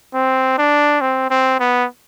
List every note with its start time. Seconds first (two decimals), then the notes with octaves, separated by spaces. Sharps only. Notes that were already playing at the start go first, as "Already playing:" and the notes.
0.14 C4
0.58 D4
1.01 C4
1.30 C4
1.60 B3